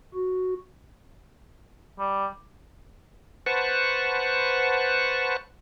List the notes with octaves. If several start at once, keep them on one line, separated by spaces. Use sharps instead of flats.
F#4
G3
B4 C5 F#5 A5 C#6